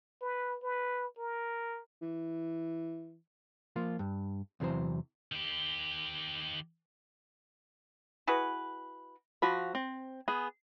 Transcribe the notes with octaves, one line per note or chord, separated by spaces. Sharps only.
B4
B4
A#4
E3
F3 A#3 F4
G2
E2 C3 E3 F#3 C5
D#3 G4
E4 F#4 G#4 B4
F3 F#4 F#5 B5
C4
B3 G#4